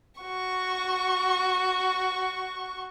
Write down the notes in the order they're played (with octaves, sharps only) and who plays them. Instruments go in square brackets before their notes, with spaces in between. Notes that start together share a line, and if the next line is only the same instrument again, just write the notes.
[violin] F#4 C#6